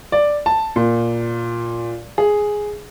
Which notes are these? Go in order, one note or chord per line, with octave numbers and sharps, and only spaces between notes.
D5
A5
A#2
G#4